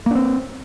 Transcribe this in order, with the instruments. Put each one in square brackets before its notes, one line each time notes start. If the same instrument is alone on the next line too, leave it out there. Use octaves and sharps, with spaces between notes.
[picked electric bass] A#3
D4
C4